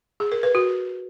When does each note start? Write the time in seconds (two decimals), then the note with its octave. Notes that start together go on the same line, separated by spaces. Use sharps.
0.20 G#4
0.32 A#4
0.43 B4
0.55 F#4